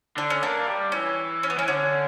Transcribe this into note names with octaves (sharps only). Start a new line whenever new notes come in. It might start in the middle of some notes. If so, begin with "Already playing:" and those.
D3 D4
C#4
A#3 D4
G3
E3 C#4
C#4
B3
E3 C#4
D3 C#4